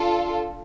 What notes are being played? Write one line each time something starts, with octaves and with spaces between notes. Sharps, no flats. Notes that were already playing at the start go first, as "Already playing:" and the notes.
Already playing: D4 F4 A4